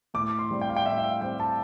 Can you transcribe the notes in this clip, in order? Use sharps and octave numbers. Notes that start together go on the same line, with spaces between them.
A2 D6
C6
G3 C4
G5
F5
G5
A2 E5
E5
F5
G3 C4 G5
A5